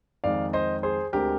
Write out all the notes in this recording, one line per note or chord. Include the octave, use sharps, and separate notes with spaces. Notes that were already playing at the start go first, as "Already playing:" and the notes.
F2 D#3 G#3 D5 F5
C5 D#5
G#4 C5
D2 D3 G#3 C4 G4 A#4